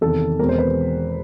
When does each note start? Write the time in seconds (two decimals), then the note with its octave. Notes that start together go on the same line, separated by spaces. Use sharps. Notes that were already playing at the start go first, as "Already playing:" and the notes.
0.01 E2 C3 D#3 A4
0.39 E2 B2 G#3 C4 A#4
0.49 C5
0.58 B4